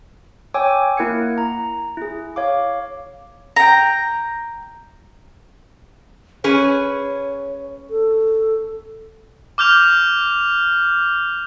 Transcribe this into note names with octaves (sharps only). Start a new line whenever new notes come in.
C#5 G5 G#5 D6 E6
A#3 E4 A#4 F#5 G#6 C#7
A#5
E4 G#4
C#5 F5 D6
G5 A#5
C#4 G#4 B4 C#5
A4
D6 F6 G6 F7